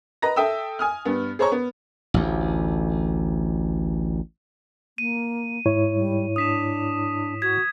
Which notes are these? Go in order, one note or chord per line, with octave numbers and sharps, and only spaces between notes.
B4 D#5 A#5 A#6
A4 E5 G5 D#6 E6
G#5 D#6 F6
G2 B3
G#4 C5 C#5 A#5 C#6
B3
A1 D2
A#3 D#7
G#2 E4 C#5
G3
D4 D#6 B6 E7
F#4 G#6 B6